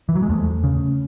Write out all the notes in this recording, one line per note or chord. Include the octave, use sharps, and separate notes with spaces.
E3
F#3
G#3
E2 A3
C#3